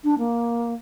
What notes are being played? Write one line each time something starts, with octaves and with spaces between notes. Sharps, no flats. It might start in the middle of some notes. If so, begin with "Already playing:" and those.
D4
A#3